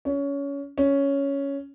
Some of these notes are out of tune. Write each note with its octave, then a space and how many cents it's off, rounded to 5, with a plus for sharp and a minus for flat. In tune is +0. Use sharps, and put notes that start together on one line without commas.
C#4 +20
C#4 +5